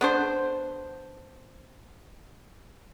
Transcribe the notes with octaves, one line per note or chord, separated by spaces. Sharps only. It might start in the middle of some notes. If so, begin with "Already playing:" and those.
B3 D4 C5